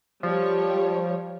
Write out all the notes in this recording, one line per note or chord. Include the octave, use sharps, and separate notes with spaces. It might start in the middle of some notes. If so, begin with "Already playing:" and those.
F3 G3 C#5